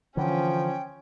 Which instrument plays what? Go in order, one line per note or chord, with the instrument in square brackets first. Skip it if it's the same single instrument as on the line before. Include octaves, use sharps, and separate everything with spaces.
[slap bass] D3 E3 [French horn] F3 [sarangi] C#4 [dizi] G5